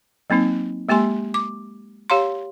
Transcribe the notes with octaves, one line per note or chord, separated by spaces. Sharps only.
F#3 A#3 C4 D#4
G#3 A#3 G4 G#5 C6
D6
G4 C#5 F5 A#5 C6